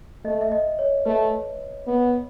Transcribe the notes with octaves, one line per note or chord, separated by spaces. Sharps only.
A3 D#5
E5
D#5
C#5
A3 B4
B3